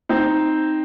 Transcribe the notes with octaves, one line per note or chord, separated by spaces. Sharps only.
C4 D#4